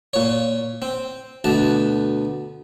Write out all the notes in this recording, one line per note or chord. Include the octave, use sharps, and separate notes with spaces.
A#2 C#5
C4
D2 B2 A5